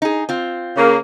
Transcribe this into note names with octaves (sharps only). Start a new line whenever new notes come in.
D#4 G#4
C4 F4
C#3 A#3